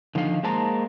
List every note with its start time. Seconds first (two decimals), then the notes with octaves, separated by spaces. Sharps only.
0.15 D3 D#3 F3 D#4 A4 F5
0.43 G#3 A#3 C5 A5 A#5